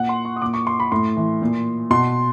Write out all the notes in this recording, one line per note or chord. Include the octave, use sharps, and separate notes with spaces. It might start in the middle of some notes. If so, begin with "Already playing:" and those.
Already playing: A#2 F#5
C6
C#6
D#6
A#2 D6
C#6
C6
B5
A2 C6
E3
A#2
B2 C6